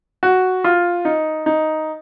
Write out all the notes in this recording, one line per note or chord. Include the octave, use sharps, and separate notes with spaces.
F#4
F4
D#4
D#4